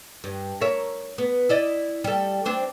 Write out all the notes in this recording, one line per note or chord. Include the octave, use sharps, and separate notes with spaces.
G2
A#4 C#5 E5
B3
E4 D5 D#5
G3 A4
C4 D4 C5